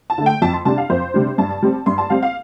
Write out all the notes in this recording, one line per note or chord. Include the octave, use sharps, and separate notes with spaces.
A5
D3 A3
G5
F2 A5
C6
C3 G3 D4 A5
F5
F2 C5
C3 G3 D4
G2 A5
G3 C4
G2 C6
A5
G3 C4 F5
F5